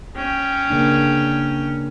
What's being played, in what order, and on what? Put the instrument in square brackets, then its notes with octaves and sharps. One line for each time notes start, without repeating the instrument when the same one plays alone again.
[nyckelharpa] C#4 G5
[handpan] C#3 A#3 D4